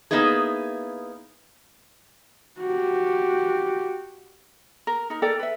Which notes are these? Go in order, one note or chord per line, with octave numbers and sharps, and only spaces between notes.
A#3 B3 D#4 E4 G#4
F#4 G4
A#4
D#4 A#4
A4 A#4 D5 G5
B4 E5